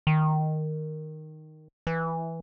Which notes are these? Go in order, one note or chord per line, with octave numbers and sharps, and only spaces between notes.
D#3
E3